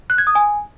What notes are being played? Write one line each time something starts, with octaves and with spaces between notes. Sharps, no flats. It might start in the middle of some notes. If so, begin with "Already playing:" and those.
F#6
G#6
D#6
G#5